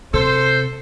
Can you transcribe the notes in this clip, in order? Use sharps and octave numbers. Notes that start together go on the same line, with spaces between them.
C3 A4 C5